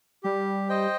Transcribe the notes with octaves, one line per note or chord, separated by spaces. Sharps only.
G3 G4
C5 D#5 G5